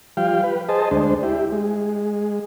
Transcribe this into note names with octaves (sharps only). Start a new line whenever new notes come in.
F3 G3 F5 G5
B4
G#4 C5 D#5 A5
D2 G#3 D4 C5
E4 G4
G#3